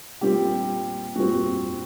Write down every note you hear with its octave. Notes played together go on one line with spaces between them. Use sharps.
A#2 G3 C4 G4
A#2 G3 C4 F#4